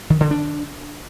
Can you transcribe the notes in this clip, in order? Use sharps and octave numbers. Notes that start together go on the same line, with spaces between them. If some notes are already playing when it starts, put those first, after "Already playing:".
D#3
D3
D4